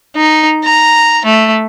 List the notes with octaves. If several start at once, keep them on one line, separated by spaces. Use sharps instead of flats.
D#4
A#5
A3